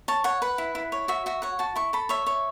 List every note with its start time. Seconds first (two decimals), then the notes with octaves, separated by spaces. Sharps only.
0.08 C#5 A5
0.24 C#5 F#5
0.42 B4 F#5
0.58 E4
0.75 E4
0.92 C#5
1.08 F#4 E5
1.26 F#4 E5
1.42 C#5 F#5
1.59 F#4 A5
1.76 E4 C#6
1.93 A4 B5
2.09 C#5 E5
2.27 C#5